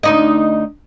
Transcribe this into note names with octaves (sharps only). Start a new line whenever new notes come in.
D2 D#4 D#5